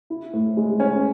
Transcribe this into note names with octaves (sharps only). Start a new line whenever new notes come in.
E4
A2
G#3
C#4